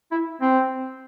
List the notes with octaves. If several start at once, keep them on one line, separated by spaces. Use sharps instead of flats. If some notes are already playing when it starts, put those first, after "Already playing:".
E4
C4